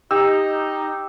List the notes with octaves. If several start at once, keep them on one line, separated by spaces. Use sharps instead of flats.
D#4 G4 E6